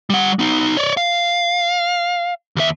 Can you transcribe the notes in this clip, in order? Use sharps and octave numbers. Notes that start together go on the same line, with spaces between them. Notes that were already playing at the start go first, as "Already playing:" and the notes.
G3 F#5
B3 D#4
C#5 D5
F5
D#2 E5